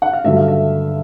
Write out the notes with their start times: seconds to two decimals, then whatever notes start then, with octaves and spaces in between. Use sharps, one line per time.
0.02 F#5
0.13 F5
0.24 G2 D3 F#3 A3 D4 E5
0.37 F5
0.48 E5